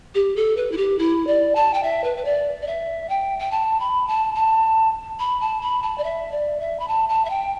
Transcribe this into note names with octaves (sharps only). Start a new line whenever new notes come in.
G4
A4
B4
E4
G4
E4
D5
A5
G5
E5
B4
B4
D5
D5
E5
G5
G5
A5
B5
A5
A5
B5
A5
B5
A5
D5
E5
D5
E5
B5
A5
A5
E5
G5